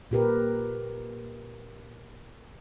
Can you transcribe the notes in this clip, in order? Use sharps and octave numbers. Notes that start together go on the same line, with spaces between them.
A#2 G4 A#4 B4